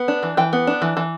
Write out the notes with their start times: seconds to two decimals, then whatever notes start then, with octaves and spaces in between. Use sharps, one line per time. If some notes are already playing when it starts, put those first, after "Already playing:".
Already playing: B3
0.08 D4
0.23 E3
0.37 E3 G5
0.53 B3
0.67 D4
0.82 E3
0.97 E3